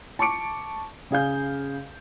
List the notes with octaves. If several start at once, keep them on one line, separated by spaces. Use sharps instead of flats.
A5 C#6 D6 C#7 D7
C#3 G#4 F5 G6